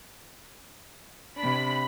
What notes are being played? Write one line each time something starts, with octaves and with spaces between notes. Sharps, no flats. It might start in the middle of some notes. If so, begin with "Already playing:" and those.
C3 D4 B5